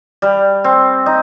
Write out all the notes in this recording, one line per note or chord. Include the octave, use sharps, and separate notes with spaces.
G3
C4
D#4